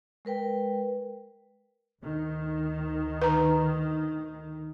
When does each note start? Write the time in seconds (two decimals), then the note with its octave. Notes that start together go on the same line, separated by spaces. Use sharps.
0.25 G#3 A#4 B4 G5
2.01 D2 D#3
3.22 B4 A#5